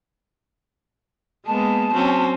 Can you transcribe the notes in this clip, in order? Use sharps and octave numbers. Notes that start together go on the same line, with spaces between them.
G#3 A#3 B3 A5
F#3 C4 C#4